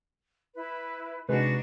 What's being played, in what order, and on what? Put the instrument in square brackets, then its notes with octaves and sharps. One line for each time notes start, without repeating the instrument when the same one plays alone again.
[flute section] E4 B4
[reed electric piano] C3 G#3 [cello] D4 D#4 [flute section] F#4 [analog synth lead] B4